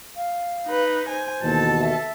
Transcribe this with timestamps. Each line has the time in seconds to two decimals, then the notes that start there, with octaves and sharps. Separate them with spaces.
0.16 F5
0.66 D#4 B4
1.08 C5 G#5
1.42 D#2 B2 E3 A4 A5
1.81 E5